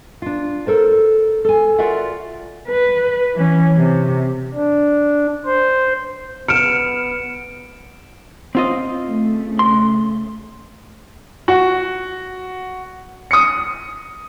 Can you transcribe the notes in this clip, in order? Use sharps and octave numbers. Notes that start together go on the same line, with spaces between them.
D4 F4
A4 A#4 C5
A4 G#5
F4 F#4 A#4 D5 E5 F#5
B4
E3 C#4
C3
D4
C5
B3 F6 C#7 D7 E7
C4 F4 D#5
C#3 A3
C6
F#4
D#6 C#7